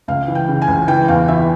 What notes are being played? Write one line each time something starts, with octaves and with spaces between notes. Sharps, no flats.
C#2 F5
E3
G5
C#3
G#5
C#2
E3 G5
E2 F5
E3 E5